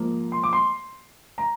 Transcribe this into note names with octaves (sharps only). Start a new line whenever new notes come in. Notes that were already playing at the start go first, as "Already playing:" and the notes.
Already playing: G#2 F3 A#3
C6
D6
C6
A#5